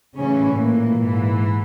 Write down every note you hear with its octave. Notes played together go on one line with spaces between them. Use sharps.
A2 C#3 E3 C#4
A#2 A#3
G#2 E3